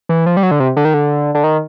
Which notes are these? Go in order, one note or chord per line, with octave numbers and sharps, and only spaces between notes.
E3
F3
G3
F#3
D3
C3
D3
D#3
D3
D3
D#3